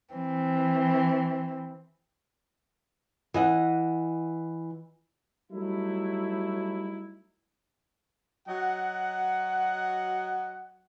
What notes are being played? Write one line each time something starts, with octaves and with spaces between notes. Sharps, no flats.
E3 C4
E3 D#5 F#5
F#3 G3 A3 D#4 E4
F#3 F#4 D#5 F#5